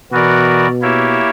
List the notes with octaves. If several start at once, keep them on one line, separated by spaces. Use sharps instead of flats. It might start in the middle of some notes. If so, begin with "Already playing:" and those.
B2 E3 B3 F#4 A#4 D5
A#3 E4 G4 C#5 E5